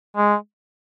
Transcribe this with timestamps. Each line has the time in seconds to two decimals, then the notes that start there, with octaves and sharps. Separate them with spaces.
0.17 G#3